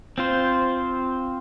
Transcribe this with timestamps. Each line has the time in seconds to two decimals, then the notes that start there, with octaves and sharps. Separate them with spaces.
0.18 C4 F4 C5